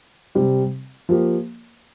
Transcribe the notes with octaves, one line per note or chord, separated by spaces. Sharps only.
C3 G3 C4 G4
F3 A#3 G4